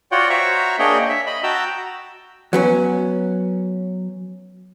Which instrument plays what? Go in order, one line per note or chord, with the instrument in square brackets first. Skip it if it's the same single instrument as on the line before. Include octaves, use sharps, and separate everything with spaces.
[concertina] F4 F#4 C#5 D5 F#5 G5
F#4 C5 C#5 E5 A#5 C#6
A#3 D4 G#4 C#5 D#5 G5
E5
D#5 B5
F#4 G5 A5 A#5 E6
[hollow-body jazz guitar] F#3 B3 C#4